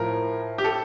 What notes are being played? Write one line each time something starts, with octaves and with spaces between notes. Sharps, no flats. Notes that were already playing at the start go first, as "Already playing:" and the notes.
Already playing: A2 F3 A#4
G4
A4